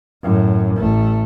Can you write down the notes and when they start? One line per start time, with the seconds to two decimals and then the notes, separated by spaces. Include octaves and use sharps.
0.23 F#2 A2
0.76 A1 A3